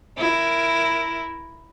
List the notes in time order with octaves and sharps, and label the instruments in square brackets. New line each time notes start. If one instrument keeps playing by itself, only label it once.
[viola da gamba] E4 A#4